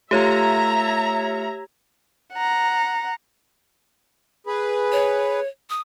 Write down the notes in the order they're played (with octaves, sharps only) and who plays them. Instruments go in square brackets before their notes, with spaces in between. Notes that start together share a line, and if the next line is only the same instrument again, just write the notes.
[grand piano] A3 F4 [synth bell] G4 C#5 G#6 [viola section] E5 A#5
[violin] F#5 A#5
[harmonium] G#4 B4
[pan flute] C#5
D#6